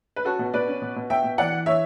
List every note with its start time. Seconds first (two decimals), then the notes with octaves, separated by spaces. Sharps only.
0.16 B4
0.25 C#4 F#4 A4
0.39 B2
0.54 B2 B4 D5
0.68 C#4
0.82 B2
0.96 B2
1.10 B2 E5 G5
1.24 B2
1.38 E3 D5 F#5
1.52 E3
1.66 E3 C#5 E5